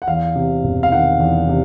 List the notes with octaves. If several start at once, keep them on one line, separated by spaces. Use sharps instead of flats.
F#5
E2 F5
C3
E1
F5
D#3 F#5
E2
C3